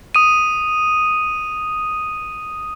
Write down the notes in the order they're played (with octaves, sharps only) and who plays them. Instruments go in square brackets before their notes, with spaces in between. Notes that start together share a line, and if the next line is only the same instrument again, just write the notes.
[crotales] D#6 D#7